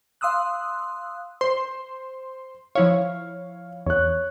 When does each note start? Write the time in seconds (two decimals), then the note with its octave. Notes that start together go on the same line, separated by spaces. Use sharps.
0.21 F5 C6 D#6 E6 F#6
1.41 C5 C6
2.75 F3 E4 C#5 F5
3.86 E2 C#5 F#6